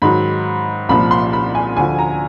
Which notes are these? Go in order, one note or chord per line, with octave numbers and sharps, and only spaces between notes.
G#2 D#3 F#3 B5
C2 A#2 F3 B5
C6
B5
G#5
D2 D3 F3 G#5
A#5